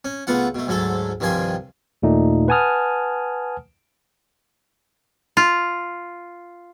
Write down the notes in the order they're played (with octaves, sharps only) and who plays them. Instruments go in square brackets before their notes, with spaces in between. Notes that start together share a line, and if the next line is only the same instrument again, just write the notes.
[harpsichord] C#4
C#2 A3 B3 F4 F#5
B2 A3
D2 G#2 F#3 A3 A4
C2 G2 D#3 F3 G#5 C6
[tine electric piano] D#2 A#2 A3 D#4
B4 F#5 G#5 A5 D#6 F6
[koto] F4